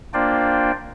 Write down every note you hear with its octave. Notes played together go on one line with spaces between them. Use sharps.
A#3 D4 F4 C5 D5 G5